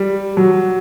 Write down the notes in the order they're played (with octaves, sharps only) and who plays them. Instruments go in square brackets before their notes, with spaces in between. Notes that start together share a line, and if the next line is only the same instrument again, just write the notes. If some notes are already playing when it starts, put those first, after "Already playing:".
Already playing: [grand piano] G3
F#3